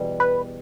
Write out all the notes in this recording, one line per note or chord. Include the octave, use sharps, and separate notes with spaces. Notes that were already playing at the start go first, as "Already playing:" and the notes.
Already playing: E2 B2 G3
B4